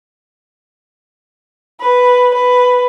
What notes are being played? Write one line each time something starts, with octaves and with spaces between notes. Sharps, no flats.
B4
B4